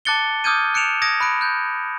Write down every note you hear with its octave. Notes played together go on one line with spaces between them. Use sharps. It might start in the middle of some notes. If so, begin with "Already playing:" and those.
A5 D6 F#6 A6 C#7 G7
D6 D#6 F6 G6 G#6 D#7
F#6 C#7 D7 E7 F7
D#6 G#6 A#6 D7
B5 F#6 D7
F#6 G6